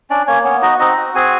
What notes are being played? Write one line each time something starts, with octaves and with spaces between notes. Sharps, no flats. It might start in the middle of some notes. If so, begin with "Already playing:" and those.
C#4 D4 D5
A#3 C#4 C#5
B3 C#4 C#5
D#4 F#4 D#5
C4 D#4 D#5
F#4
C4 G#4 G#5